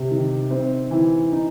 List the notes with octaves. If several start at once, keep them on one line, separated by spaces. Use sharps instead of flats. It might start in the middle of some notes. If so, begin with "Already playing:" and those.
Already playing: C3
D#3
C4
E3
D#4